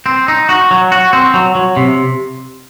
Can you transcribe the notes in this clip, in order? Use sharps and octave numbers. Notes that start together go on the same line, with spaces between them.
C4
D#4
F#4
F#3
F#4
C4
F#3
F#3
C3